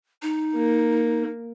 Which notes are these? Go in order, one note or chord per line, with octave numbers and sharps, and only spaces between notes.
D#4
A#3